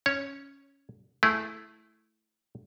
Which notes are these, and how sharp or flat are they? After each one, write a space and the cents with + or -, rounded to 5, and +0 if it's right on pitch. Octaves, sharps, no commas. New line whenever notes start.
C#4 +0 C#5 +0
A3 -10 E4 +0 G#4 +0